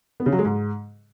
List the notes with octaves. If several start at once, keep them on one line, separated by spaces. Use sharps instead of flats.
B3
C#3
F#3
G#3
G#2